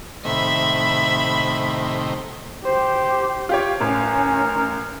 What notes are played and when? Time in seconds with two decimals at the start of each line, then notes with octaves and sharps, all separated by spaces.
0.25 A2 C3 D#3 E5 B5
2.65 G4 C5
3.49 F4 G4 C#5
3.81 A1 C#4 A#4